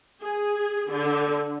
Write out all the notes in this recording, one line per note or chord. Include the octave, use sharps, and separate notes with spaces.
G#4
D3